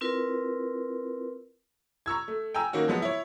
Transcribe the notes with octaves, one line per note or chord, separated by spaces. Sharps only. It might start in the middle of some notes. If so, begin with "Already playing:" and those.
C4 E4 F4 A#4 B4
A#5 C#6 E6 G#6
A3
G5 G#5 A#5 E6
D#3 A#3 C#4 F#4
F3 F#3 G#3 B3
E4 C#5